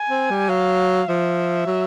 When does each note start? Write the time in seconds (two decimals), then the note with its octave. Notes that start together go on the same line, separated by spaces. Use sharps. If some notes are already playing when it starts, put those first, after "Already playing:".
Already playing: G#5
0.10 C4
0.30 G3
0.49 F#3 F5
1.08 F3 E5
1.66 F#3